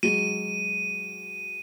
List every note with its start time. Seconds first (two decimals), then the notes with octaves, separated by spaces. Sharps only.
0.03 F#3 G#3 D#7